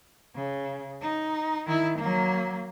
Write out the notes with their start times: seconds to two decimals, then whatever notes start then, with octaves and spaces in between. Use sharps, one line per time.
0.35 C#3
1.02 D#4
1.66 D#3 E4
1.99 F#3 A#3